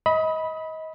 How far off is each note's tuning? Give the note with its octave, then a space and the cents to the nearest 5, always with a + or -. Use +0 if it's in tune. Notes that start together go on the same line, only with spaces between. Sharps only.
D#5 +30 B5 -10